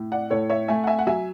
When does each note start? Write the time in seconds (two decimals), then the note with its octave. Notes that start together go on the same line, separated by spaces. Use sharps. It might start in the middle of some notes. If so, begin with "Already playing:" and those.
Already playing: A2
0.12 D5 F#5
0.30 A2 A4 C#5
0.50 C#5 E5
0.68 A3 E5 G#5
0.84 F#5
0.87 E5 G#5
0.99 F#5
1.07 F#3 E5 G#5